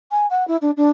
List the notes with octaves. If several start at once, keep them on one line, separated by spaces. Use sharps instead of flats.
G#5
F#5
E4
D4
D4